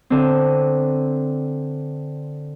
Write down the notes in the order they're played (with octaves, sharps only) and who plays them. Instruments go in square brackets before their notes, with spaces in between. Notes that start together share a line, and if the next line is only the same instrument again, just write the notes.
[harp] D3 C4